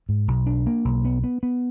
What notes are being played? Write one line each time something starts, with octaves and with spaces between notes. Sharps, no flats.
G#2
B1
D4
A#3
B1
B3
B3
B3